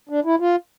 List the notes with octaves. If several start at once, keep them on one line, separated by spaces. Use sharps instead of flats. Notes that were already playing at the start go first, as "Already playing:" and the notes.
D4
E4
F4